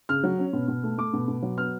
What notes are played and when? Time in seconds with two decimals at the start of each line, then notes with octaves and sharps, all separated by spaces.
0.09 C#3 F6
0.23 F#3
0.39 C#4
0.53 B2
0.68 B2
0.83 A3
0.98 A3 D6
1.13 B2
1.28 B2
1.42 F#3
1.57 B3 F6